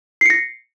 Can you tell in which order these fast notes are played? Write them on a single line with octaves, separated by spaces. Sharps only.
C7 C#7 A#6